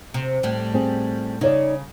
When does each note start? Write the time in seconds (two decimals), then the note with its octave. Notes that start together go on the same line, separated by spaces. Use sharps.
0.14 C3
0.43 A2 G3
0.74 C4 G#4
1.41 C#3 D#4 C#5 D5